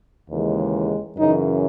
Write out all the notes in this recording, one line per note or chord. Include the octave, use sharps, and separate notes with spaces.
D#2 C#3 E3 G#3
F#2 C#3 E3 D#4